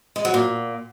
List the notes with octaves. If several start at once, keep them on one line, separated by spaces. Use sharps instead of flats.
G#3
F#3
A#2